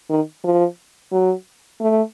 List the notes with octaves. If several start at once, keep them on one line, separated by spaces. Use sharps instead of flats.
D#3
F3
F#3
A3